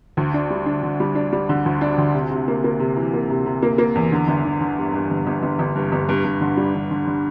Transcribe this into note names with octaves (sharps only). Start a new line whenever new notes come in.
D2
D4
G3
D4
D3
G3
D4
G3
D3
D2
D4
D2
C3
C3
A#3
A#3
C3
E3
A#3
C3
C3
A#3
A#3
E2
D3
G1
D3
D3
G2
G2
G1
G1
G1
G1
G2
G1
G2
G2
D3
G3
D3
D3
D3